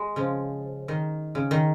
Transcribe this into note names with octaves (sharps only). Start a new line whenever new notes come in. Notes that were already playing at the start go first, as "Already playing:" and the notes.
Already playing: G#3
C#3 F3
D#3
C#3
D#3